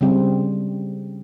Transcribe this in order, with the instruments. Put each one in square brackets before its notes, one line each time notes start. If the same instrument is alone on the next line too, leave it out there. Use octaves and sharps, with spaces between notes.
[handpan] C#3 G3 C4